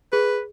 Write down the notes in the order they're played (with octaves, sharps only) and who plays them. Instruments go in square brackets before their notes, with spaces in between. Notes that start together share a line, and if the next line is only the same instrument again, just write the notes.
[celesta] G#4 [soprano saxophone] B4